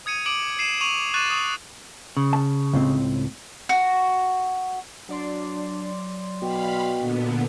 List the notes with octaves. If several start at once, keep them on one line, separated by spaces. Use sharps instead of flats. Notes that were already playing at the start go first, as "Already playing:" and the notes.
D#6 G#6 C#7 D#7
D6 D7 F#7
C7 D#7 E7
C#6 D#7 F7 F#7
C#6 D6 F#6 A6 D#7 E7
C#6 D#6
C#3
A5
C#2 A2 C4
F#4
F#3 D4 D5 C6
B2 F5 G5 B5
A#2 D3 B3